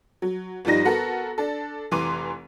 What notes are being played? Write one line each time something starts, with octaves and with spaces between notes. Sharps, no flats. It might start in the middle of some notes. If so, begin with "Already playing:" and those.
F#3
G1 F3 G3 D#4 A#6
B3 F#4 A4 A#4
D4 A4
F1 E3 A#5 C6 D6 D#7